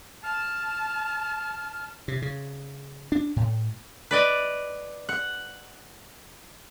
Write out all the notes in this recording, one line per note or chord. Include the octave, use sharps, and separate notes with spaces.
A5 F6
C3
C#3
D4
A2
B4 D5 D#5
F#5